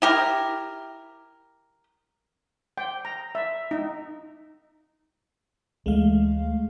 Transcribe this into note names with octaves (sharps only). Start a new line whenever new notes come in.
E4 G4 A#4
G5
A#5
E5
D#4
D2 E3 G#3 A3 F5